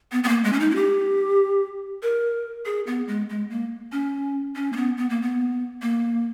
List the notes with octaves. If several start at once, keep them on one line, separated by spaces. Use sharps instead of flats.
B3
B3
A#3
G#3
C#4
D#4
E4
G4
A#4
G#4
B3
G#3
G#3
A#3
C#4
C#4
A#3
B3
B3
A#3
B3
A#3